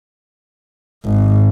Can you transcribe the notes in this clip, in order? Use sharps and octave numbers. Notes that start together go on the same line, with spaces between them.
G#1